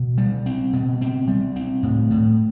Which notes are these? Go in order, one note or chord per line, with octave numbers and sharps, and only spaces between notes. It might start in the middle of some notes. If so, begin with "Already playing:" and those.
Already playing: B2
G3
C4
B2
C4
G3
C4
A2
A2